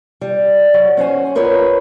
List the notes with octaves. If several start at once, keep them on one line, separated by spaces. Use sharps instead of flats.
G3
F#3
C#4 F#4 C5 G#5
F4 A#4 B4 C#5 D#5